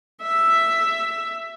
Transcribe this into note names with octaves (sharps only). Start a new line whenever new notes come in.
E5